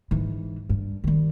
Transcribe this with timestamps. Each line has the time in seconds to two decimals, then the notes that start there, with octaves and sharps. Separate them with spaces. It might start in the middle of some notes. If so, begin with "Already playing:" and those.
0.11 G#2 E3
0.69 G2
1.04 D#3 G3